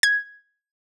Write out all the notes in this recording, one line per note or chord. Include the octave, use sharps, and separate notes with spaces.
G#6